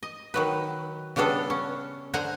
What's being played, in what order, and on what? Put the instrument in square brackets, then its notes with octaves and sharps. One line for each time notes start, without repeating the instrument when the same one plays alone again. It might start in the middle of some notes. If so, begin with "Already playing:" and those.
[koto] D#5
D#3 F#3 B4
C#3 G3 B3 D4 A4
C#4
D3 C5 F#5 G#5 A#5